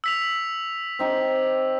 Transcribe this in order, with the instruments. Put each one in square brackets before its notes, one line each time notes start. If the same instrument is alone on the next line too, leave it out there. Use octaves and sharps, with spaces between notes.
[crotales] E6 B6 F7
[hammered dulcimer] C4 D#4 G4